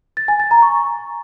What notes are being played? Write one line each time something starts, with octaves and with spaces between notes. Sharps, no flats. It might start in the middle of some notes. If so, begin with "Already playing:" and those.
A6
G#5
A6
A#5
C#6